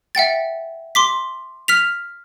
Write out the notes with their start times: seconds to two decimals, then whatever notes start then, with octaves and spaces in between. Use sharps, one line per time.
0.15 E5 F#5 G5 A6
0.95 C6 D6 B6
1.68 F6 B6 F7